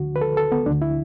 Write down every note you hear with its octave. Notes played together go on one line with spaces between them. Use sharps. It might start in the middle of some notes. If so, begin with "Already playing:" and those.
Already playing: D2 D3 F#4
B4
A4
A4
B3
D2 D3 D4
E4